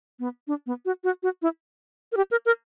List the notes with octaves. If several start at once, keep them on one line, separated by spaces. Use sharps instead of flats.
B3
D4
B3
F#4
F#4
F#4
E4
A#4
G4
A#4
A#4